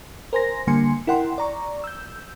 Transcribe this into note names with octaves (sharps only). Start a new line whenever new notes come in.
A#4 C5 G#5 C6 A#6
D3 G3 A#3 G#5 C6 C#7
E4 A#4 F#5 G5 C6
D5 A#5 C#6
E6 G6